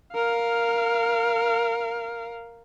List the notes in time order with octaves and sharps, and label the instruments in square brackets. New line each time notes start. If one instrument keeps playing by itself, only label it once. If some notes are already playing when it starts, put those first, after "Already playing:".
[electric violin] A#4 F5